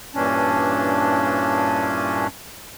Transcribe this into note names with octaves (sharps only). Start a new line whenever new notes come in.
G2 A#2 E3 C#4 D4